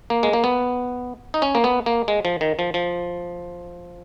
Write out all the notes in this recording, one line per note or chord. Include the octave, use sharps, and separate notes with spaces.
A#3
G#3
A#3
B3
D#4
C#4
A#3
B3
A#3
G#3
F3
D#3
F3
F3